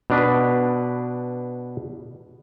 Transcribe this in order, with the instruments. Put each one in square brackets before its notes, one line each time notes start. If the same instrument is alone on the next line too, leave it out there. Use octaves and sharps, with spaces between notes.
[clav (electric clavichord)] B2 D4 B4